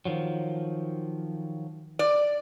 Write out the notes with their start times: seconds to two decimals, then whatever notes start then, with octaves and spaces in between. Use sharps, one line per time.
0.05 D#3 F3 F#3
1.99 D5